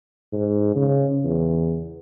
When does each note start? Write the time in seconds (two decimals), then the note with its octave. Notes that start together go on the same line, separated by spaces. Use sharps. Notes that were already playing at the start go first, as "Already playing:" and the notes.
0.33 G#2
0.76 C#3
1.24 E2